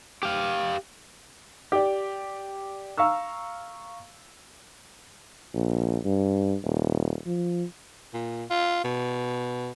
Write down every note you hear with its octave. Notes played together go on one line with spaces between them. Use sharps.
G4 F5
G4 D5
F5 A#5 C#6 E6
A#1
G2
D#1
F3
A#2
F4
B2